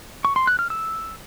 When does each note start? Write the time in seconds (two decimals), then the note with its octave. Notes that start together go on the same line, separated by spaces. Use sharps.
0.25 C#6
0.36 C6
0.47 F#6
0.59 F6
0.70 E6